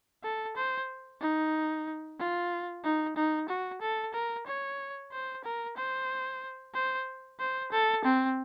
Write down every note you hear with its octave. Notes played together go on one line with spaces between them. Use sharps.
A4
C5
D#4
F4
D#4
D#4
F#4
A4
A#4
C#5
C5
A#4
C5
C5
C5
A4
C4